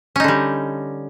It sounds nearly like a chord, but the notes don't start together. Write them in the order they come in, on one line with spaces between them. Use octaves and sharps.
C#4 D#4 D3 G3